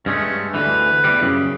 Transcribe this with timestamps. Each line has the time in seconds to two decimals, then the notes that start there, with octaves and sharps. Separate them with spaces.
0.06 G2 G#3 A3 C#4
0.54 D2 D3 E3 B4
1.05 E2 E3 G3
1.22 F#2 C#3